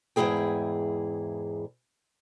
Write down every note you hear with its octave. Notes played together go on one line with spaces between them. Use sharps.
E2 G#2 F#3 E4 G#4 G5